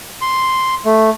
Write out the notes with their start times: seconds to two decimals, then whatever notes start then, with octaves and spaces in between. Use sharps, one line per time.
0.21 C6
0.85 A3